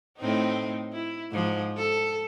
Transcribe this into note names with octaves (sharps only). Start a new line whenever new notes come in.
A2 C4 D#4
E4
G#2 F3
A4